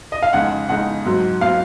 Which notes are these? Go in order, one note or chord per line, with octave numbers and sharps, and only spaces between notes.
D#5
F5
F2 C#3 G#3 D#4 F#5
F2 C#3 G#3 D#4 F#5
G#2 F#3 C4
F#3 C4 F5